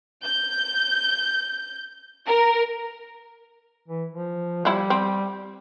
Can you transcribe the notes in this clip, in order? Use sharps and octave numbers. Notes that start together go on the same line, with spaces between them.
G6
A#4
E3
F3
F3 G3 E4
C4